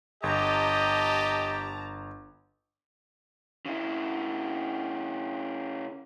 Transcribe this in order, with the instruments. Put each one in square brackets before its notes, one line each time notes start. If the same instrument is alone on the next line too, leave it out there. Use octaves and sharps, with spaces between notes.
[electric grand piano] G1 [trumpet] G4 [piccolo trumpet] D#5 [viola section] A5 A#5
[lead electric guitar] C#3 E4